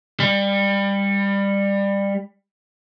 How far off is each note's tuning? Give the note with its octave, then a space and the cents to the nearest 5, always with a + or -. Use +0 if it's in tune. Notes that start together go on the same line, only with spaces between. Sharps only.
G3 +20